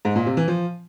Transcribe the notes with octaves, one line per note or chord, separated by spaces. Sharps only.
G#2
A#2
C3
E3
F3